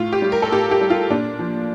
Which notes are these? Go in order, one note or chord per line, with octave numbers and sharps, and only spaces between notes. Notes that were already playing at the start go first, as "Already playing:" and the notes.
Already playing: A2 F4
G4
G3
A#4
A4
A2 G4
G4
G3
F4
A#2 D4
F3